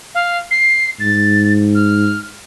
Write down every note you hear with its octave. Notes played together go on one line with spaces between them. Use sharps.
F5
C7
G#2 A6
F6